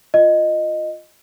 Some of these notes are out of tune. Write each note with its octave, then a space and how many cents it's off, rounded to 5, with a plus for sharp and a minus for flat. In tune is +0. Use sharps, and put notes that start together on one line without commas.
F4 +5 D#5 -10